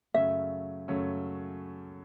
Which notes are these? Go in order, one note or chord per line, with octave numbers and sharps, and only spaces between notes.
F#2 C#3 F#3 A3 C#4 E5
F#2 C#3 F#3 A3 C#4